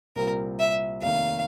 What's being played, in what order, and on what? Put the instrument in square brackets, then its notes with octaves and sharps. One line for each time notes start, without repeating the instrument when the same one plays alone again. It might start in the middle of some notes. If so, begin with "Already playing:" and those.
[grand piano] C2 A#2 G3 C4 F4 [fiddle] A#4
[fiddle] E5
[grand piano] F1 D#2 D#3 [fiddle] F5